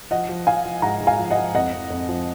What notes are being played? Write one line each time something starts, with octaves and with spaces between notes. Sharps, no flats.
F3 D#5 F#5
F3
F3 F5 G#5
F3
G#2 F#5 A#5
G#2
F5 G#5
F3
D#5 F#5
F3
F2 D#5 F#5
F2
F2
F3